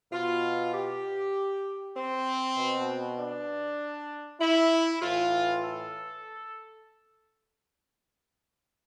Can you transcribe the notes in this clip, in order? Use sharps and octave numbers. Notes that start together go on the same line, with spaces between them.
B2 F4
G4
C4
B2
D4
E4
A2 E3 F4
A4